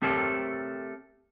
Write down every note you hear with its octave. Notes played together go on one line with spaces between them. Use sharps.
A3 C4 G4 A4 A#4 C#5